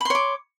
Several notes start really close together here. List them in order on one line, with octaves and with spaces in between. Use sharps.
B5 C6 C#5 D6